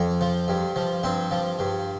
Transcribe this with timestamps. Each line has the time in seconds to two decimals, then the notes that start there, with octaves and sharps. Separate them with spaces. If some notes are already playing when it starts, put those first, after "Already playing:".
Already playing: F2
0.21 F3
0.48 G2
0.76 F3
1.03 G2 C4
1.31 F3
1.59 G2